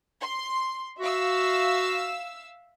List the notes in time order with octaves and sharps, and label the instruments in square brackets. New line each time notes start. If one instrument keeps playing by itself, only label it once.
[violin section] C6
[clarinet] F#4 [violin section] E5 F5 E6